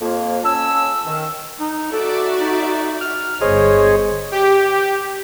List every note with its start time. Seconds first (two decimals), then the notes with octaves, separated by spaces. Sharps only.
0.01 F2 F3 A#3
0.44 C#4 A5 E6
1.06 D#3
1.60 D#4
1.92 F#4 A4 D5 E5
2.41 D#4
3.01 F6
3.41 G1 G#4 C5 C#5 D#5
4.31 G4